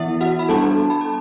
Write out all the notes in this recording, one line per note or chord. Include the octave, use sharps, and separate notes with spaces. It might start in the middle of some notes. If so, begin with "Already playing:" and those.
Already playing: E3 B3 E4 E5 F#5
F#4 F#5
B5
G3 B3 D4 A4 A5
B5
A5